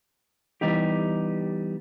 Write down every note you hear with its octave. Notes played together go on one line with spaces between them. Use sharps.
E3 G3 B3 D#4 G4